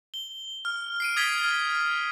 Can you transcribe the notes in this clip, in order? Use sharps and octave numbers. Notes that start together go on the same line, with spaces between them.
G7
F6
C7 D7 D#7
D#6 G#6 A6 B6 C7 G7
F6